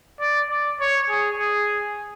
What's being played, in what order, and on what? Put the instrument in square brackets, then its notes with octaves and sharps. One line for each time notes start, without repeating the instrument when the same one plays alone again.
[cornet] D5
D5
C#5
G#4
G#4